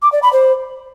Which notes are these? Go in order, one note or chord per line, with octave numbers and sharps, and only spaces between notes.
D6
D5
B5
C5